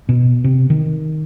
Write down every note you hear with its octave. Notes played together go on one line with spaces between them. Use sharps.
B2
C3
D#3